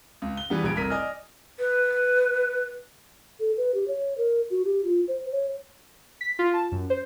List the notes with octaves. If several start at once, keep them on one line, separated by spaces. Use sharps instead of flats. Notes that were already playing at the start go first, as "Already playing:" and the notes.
C#2
G7
E3 G3 B3
A#1 G3 G#6 D7
F1 C2 A#4 B6 D#7
D5 D#5 G#5 F6
B4
A4
B4
G4
C#5
A#4
F#4
G4
F4
C5
C#5
B6
F4
A5
F#2
C5